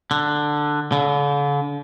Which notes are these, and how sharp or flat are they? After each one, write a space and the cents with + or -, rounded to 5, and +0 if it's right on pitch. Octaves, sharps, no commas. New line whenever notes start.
D3 +10
D3 -40